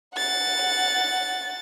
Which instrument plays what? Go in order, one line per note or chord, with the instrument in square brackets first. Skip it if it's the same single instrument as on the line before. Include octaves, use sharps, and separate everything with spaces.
[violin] F#5 A6